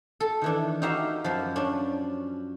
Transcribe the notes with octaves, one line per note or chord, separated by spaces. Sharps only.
A4
D#3 E3 D4
D#4 F#4 G4 E5 F5 A#5
F#2 F3
C#4 D4